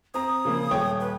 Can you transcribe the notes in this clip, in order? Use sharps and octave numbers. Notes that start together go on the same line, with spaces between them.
C4 A#5 D#6
C#3 F3 A#3
D#1 C#5 G5
B4